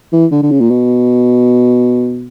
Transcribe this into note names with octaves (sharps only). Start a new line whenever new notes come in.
E3
D3
D3
C#3
A#2
B2